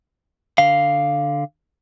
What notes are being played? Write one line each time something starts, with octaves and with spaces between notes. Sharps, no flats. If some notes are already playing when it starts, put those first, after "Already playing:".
D3 F5